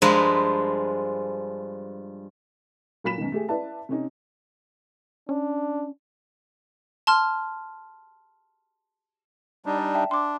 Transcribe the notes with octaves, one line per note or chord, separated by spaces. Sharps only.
G2 F3 G#3 A#4 B4 A#5
A#2 F#3 B5 B6 E7
F#2 B2 D#3
A3 G4 G#4
E4 B4 D5 E5 A5
C3 C#4 D#4
C#4 D4
A5 C6 F6
G3 D4 D#4
D5
E5 G5 A5
D4 C6 D6